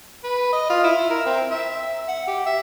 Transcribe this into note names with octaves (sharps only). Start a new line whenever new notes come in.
B4
D#5
F4
E4
A#4
C4
E5
F#5
G4
E5